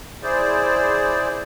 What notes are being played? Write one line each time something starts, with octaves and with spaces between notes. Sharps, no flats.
E4 G#4 C5 D5